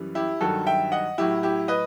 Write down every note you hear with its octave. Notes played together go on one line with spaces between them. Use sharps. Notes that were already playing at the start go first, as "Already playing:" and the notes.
Already playing: F#2 E3 G3
E4 G4
G2 D#3 F#3 F#4 A4
E5 G5
D#5 F#5
A2 F#3 E4 G4
E4 G4
B4 D#5